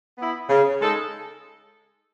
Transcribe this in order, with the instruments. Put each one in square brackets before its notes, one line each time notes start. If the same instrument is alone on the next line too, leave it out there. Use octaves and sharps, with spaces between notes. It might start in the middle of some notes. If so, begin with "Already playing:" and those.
[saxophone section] B3 E4
C#3
G#3 D#4 A4